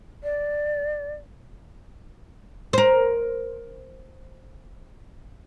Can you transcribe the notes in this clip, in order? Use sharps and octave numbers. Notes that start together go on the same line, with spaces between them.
D5
A#4 C5